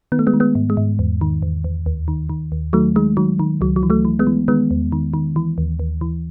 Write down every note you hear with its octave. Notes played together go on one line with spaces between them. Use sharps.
D#3 B3
A3
G#3 B3
D#3
G#3 B3
G#2
G#3
G#2
E2
D#3
E2
E2
D#2
D#3
D#3
D#2
D#3 F#3 A3
D#3 G#3
D#3 F#3
D#3
C#2 F#3
F#3
E3
F#3 A3
E3
G#3 B3
E3
D#3 G#3 B3
E2
D#3
D#3
E3
D#2
D#2
E3